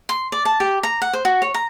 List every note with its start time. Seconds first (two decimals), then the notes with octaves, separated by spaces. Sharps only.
0.09 C6
0.32 D5
0.45 A5
0.60 G4
0.83 A#5
1.02 F#5
1.13 C5
1.25 F#4
1.42 C#5
1.54 A#5